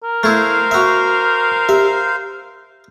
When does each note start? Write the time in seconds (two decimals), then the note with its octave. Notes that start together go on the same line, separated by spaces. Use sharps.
0.03 A#4
0.23 A3 E4 C5 F5
0.71 F#4 E5
1.69 G4 E5